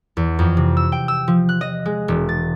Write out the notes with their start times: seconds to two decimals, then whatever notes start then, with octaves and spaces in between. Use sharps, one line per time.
0.17 E2
0.39 F2
0.57 C3
0.77 E6
0.92 G5
1.08 E6
1.28 F3
1.49 F#6
1.61 D#5
1.86 G#3
2.08 E1
2.29 A6